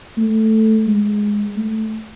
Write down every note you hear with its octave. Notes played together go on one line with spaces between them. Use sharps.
A3
G#3
A3